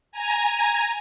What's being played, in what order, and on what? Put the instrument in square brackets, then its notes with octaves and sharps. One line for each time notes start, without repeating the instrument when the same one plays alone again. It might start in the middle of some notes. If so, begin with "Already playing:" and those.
[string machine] G#5 A#5